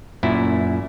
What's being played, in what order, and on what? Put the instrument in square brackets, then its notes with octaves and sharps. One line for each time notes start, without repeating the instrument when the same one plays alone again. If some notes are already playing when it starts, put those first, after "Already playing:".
[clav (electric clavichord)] F#2 A#2 E4